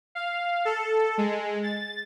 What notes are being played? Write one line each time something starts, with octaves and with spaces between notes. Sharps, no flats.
F5
A4
G#3
A6